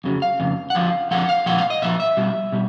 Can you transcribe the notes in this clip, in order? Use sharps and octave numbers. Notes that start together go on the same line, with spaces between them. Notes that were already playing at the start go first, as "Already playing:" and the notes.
F2 C#3 F#3
F5
F2 C#3
F#5
F2 D3 F3 F5
F2 D3 F3 F#5
F5
A#2 F3 F#5
F5
D#5
A#2 F3 E5
E5
B2 G3
B2 G3